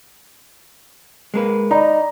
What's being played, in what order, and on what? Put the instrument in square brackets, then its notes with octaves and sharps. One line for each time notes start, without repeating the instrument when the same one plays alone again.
[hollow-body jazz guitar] G#3 A#3 B4
[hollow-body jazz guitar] D#4 [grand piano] D5 A#5 B5 [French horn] D#5